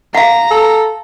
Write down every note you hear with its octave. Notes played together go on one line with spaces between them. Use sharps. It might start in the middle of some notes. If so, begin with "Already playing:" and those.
F5 F#5 A#5
A4